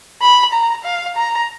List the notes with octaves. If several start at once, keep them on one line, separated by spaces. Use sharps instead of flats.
B5
A#5
F5
A#5